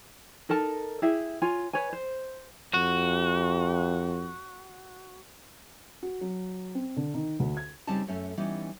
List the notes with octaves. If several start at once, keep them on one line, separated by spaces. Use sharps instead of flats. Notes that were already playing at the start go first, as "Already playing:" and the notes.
D#4 A4 A#4 A5
E4 G4 G#4 E5
F4 C#5 G#5
B4 C#5 G#5
C5
F2 F#4
F#4
F#3
C4
D3
D#3
D2
G#6
C#3 G3 C4 C#4 D#4 A5
F#2 A3 C#4 A4
E3 G3 B3 C#4 D#4